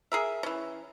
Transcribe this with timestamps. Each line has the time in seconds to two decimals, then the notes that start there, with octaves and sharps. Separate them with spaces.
0.12 G#4 A#4 E5
0.43 E3 C#4